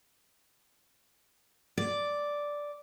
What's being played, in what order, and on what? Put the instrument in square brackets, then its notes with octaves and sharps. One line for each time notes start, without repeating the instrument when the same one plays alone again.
[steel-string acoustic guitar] D5